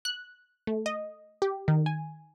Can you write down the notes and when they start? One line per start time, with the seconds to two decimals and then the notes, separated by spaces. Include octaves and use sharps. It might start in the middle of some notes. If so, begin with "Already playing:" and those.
0.05 F#6
0.67 A3
0.86 D#5
1.42 G4
1.68 D#3
1.86 G#5